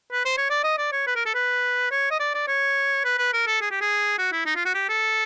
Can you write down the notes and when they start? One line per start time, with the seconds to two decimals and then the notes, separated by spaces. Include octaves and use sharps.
0.12 B4
0.25 C5
0.38 C#5
0.50 D5
0.64 D#5
0.78 D5
0.92 C#5
1.07 B4
1.16 A#4
1.26 A4
1.35 B4
1.91 C#5
2.11 D#5
2.20 D5
2.34 D5
2.48 C#5
3.05 B4
3.18 B4
3.33 A#4
3.47 A4
3.62 G#4
3.71 G4
3.81 G#4
4.19 F#4
4.33 E4
4.46 D#4
4.56 F4
4.65 F#4
4.75 G4
4.89 A4